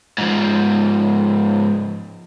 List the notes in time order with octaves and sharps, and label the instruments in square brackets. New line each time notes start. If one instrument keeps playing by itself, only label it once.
[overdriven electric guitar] G#2 F3